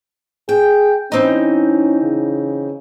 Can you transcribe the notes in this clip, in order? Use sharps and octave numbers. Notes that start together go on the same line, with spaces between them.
G#4 G5
E3 C4 C#4 D#4
C#3